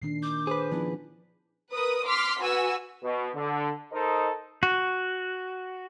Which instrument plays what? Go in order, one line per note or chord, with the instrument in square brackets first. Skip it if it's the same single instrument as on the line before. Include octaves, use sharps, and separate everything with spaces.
[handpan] A#2 D#3 D4 [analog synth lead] C7
[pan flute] D6 [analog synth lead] G6
[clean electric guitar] G#4 B4 [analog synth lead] C5
[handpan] F3 B3 C#4 [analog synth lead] D4 [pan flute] E4
[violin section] A#4 B4 D#6
C6 D6 F6 B6
F#4 B4 G#5 E6
[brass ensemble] B2
D3
D#4 A4 A#4 C5 D#5
[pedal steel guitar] F#4